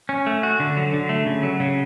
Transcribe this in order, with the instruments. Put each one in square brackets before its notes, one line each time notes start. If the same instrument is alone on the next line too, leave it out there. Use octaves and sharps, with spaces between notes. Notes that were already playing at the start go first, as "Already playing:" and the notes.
[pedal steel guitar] C#4
A3
F#4
D3
F#3
D3
A3
C#3
F#3
C#3